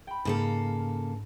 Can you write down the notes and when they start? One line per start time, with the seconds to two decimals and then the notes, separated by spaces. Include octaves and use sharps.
0.07 G5 B5
0.25 G#2 C#3 A#3 A4